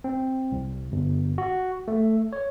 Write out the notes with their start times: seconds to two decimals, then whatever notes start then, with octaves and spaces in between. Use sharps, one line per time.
0.04 C4
0.52 C2
0.92 G1
1.38 F#4
1.88 A3
2.33 C#5